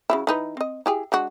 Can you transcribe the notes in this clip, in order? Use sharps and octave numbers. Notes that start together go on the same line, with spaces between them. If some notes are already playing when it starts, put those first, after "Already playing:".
C#3 F#3 E4
E3 D#4 B4
C4 D#5
E4 G4 G#4
G#3 D4 F#4